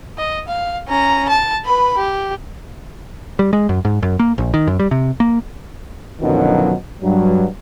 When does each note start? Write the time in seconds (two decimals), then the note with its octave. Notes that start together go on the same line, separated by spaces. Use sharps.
0.18 D#5
0.48 F5
0.89 C#4 A#5
1.29 A5
1.66 B4 B5
1.97 G4
3.39 G3
3.53 G#3
3.69 F#2
3.85 G#2
4.03 F#2
4.19 A#3
4.38 A#1
4.54 D#3
4.67 F#2
4.79 G3
4.91 C3
5.20 A#3
6.21 F#2 B2 D3 D#3 F3 F#3
7.02 G2 F#3